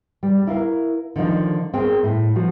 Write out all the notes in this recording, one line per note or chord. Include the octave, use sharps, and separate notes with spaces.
G3
E4 A#4 F5
D3 D#3 F3 D#4
C4 G#4 A#4 G5
A2
F3 F#4